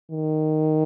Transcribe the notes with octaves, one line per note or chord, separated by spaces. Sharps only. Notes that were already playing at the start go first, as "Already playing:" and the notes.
D#3